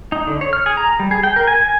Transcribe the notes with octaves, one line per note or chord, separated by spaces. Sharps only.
D#4
D3
C#5
F6
G#4
A#5
G3
G#4
G5
A#4
G#5
G#5